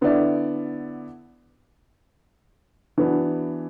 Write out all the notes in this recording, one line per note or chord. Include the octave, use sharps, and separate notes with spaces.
D3 B3 E4 D5
E3 B3 D4 F#4